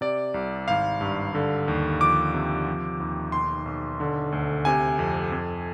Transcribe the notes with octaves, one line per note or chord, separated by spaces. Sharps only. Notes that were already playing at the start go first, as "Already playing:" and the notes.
C3 D5
C2
G#1 F5
G2
D3
D#2
F3 D6
C3
F3
D#2
B1 C6
B1
D3
D2
C3 G#5
F2
F2